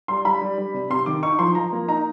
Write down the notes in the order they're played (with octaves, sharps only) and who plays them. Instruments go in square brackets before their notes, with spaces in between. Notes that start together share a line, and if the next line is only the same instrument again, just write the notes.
[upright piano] G3 C6
G3 B5
G3
G3
C3
C3 C6
D#3 D6
D#4 C#6
F3 C6
F3 A#5
A#3
D#4 A#5